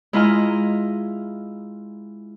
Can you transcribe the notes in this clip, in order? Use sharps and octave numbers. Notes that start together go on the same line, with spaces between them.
G#3 E4 F4 D#5 A#5 F6